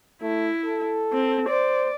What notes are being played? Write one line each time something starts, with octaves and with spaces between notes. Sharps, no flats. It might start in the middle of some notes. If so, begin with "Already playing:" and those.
A3 E4
A4
C4
C5 D5